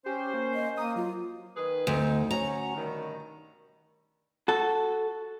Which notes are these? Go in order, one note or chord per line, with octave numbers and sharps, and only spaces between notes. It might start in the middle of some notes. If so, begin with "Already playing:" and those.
C#4 G4 C5
A#3
D#5
A#3 A#5 D#6
F#3 F4
D#3 G#4 B4
D2 C4 D#4
C#4 F#4 A#5
G2 B2 D#3
F#4 A4